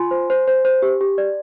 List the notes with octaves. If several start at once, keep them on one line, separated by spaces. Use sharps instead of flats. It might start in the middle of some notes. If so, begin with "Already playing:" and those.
Already playing: F4 G#5 C6
C5
C5
C5
C5
G4
G4
D5